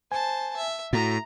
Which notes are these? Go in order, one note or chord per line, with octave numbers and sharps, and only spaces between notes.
C5 G#5 A5
E5
A2 F#4 A#5